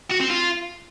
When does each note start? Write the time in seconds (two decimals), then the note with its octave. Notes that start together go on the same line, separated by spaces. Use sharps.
0.11 F#4
0.21 C4
0.30 F4